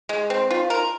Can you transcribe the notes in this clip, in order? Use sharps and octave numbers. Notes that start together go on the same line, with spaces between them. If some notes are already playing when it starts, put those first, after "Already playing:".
G#3
C4
F4
A#4